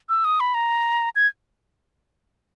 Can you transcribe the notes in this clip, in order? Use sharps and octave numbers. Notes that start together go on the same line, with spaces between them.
E6
D#6
B5
A#5
G#6